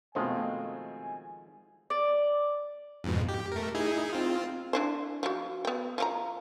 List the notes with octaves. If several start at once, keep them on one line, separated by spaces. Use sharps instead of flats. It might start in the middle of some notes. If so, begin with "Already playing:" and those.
B2 D#3 F3 G#3 A3 C4 G#5
D5
F2 G#2 B2
G4
A3 A#4
D#4 E4 G#4
C4 F4
D4 E4 C5
F3 F#4
B3 G5
F3 C4 A#5